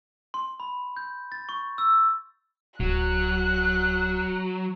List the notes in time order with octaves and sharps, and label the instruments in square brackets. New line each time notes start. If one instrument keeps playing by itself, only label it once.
[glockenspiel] C6
B5
G6
A6
C#6
E6
[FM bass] D1 [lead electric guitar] F#3 [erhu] F#6